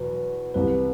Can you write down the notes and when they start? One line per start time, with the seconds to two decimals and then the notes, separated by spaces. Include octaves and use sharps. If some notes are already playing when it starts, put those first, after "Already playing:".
Already playing: E2 B2 B3 B4
0.54 C2 C3 E3 B4